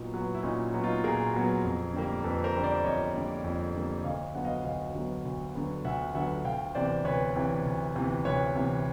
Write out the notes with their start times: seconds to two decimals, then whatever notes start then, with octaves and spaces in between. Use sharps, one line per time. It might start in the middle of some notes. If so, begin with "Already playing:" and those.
Already playing: A#2 F#3 B3 D#4
0.14 F#3 B3
0.35 E4
0.43 A#2 C#4 D#4
0.74 F#3 B3
0.84 D#4 F4
1.04 A#2 G#4 A#4
1.34 F#3 B3
1.64 F2
1.94 D3 G3 A#3
2.24 F2 A4 B4
2.44 A#4 C5
2.54 D3 G3 A#3
2.64 C5 D5
2.84 F2 C#5 D#5
3.14 D3 G3 A#3
3.44 F2
3.74 D3 G3 A#3
4.04 D2 D#5 F5
4.34 D3 F#3 B3 F#5
4.45 D#5 F5
4.64 D2 D#5 F5
4.95 D3 F#3 B3
5.25 D2
5.55 D3 F#3 B3
5.84 D2 E5 F#5
6.15 D3 F#3 B3 E5 F#5
6.45 D2 F5 G5
6.75 C3 E3 C5 D5
7.05 D2 B4 C#5
7.36 C3 E3
7.65 D2
7.96 C3 E3
8.25 D2 B4 C#5
8.55 C3 E3